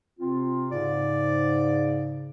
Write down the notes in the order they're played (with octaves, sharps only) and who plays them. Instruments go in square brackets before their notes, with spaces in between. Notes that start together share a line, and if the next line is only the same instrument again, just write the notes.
[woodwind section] C3 C4 F4
[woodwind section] G#2 C#3 [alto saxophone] D5